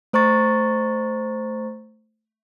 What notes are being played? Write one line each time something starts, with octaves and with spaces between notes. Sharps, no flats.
A3 C5 A#5 C#6 A6